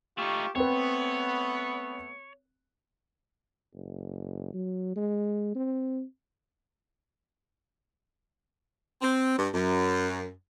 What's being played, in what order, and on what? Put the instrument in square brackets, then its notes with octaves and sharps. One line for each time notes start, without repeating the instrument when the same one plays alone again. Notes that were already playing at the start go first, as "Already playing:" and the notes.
[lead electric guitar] A3 D#4 [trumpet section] F4 G4 C#6
[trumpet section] A3 B3 [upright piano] C4 B4 [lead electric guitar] C#5
[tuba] F#1
F#3
G#3
C4
[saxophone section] C4
G2
F#2